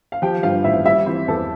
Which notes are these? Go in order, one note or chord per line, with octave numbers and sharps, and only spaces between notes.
F5
F3 G4 G5
G2 F4 F5
A1 E4 E5
G3 E4 E5
E3 C4 C5
E2 A4